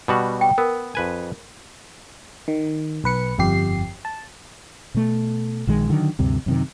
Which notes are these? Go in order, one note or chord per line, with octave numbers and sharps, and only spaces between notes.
B2 G3 F#4
G5
B3 A#4
F2 B4 G#5
D#3
B1 B4 C#7
G1 F2 G4 C7
A5
B2 A3
A#1 D#3 G#3
D3 D#3 F#3
D2 G2 C3
F#2 C3 D#3